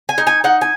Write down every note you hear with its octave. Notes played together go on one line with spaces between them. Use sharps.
G#5
D#4
G#5
D#4 F#5
G#5